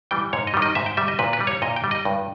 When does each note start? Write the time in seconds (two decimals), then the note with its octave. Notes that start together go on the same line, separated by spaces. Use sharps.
0.11 E3 G3 G5
0.33 G#2 C#5
0.47 D#5
0.54 D#3 G3
0.62 D#5
0.75 G#2 E5
0.86 G5
0.97 G3 E5
1.08 D#5
1.19 A#2 B4
1.33 B4
1.40 G3
1.47 C#5
1.62 A#2 D#5
1.76 G5
1.84 G3
1.91 D#5
2.05 G2